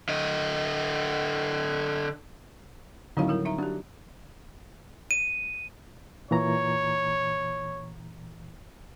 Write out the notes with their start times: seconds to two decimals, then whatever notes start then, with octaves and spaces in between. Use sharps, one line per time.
0.09 D3 D#5
3.17 A2 D3 D#3 F#3 C4 F#4 F5
3.28 G3 E4 A#4
3.45 D#4 E5 A#5
3.58 D4 F#4 G4
5.11 D#7
6.31 A#2 E3 C#5 A#5